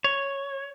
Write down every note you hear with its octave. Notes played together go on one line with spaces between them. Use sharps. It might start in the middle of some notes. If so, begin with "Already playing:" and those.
C#5